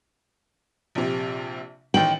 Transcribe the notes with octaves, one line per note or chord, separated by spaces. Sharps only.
A#1 C3
A1 D#3 G5 F#7